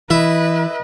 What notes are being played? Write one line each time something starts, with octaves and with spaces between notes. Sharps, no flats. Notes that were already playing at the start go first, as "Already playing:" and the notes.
E3 E4 B4 D#5